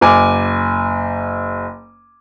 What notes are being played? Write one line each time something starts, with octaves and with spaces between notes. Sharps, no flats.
F#1 G#5 D6